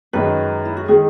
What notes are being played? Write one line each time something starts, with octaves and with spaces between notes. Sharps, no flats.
F#2 D#3 G#3 D#4 B4
E4
F#4
D#3 G#3 D#4 G#4